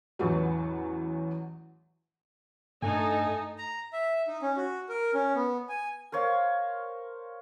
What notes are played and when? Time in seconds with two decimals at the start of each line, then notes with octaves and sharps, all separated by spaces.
0.19 A1 E2 E3 F#3
2.82 G2 A3 D#4 A4 G#5
3.58 A#5
3.93 E5
4.27 D#4
4.42 C#4
4.57 F#4
4.89 A#4
5.14 C#4
5.35 B3
5.69 G#5
6.12 A#4 C5 C#5 F5